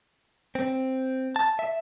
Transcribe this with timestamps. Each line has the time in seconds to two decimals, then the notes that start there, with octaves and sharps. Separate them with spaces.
0.55 C4
1.36 A5
1.59 E5